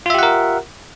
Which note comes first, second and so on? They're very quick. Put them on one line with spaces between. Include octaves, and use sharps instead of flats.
F4 E5 G4 F#5 A#4